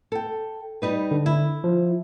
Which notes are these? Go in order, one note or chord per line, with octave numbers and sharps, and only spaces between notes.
A4 G5
G3 D#4 B4
D3
E4
F3